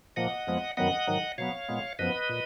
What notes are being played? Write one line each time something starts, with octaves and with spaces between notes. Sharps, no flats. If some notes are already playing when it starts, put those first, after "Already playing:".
A#2 F3 A#3 D#5 F#5
F2 F3 G#3 B3
F#2 D#3 F#3 B3 D#5 F#5
G#2 D#3 F#3
B2 F#3 B3 C#5 F5
A#2 G#3 B3
F#2 F3 B3 B4 D#5
A#2